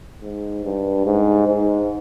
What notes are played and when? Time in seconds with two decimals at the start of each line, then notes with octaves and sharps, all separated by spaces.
0.22 G#2
0.64 G2
1.06 G#2
1.47 G#2